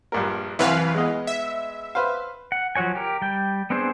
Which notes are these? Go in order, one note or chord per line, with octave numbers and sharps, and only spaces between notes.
A#1 G2 A#4
C2 F#2 E3 B4 F5
G#3 B3 D#5
E5
B4 C5 F5
F#5
F3 F#3 F#4 C#5 G#5
G4 A#4
G3 G5
B3 C4 D4 G#4 C5